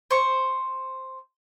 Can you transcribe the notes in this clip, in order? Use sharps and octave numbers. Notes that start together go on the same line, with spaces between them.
C5 C#6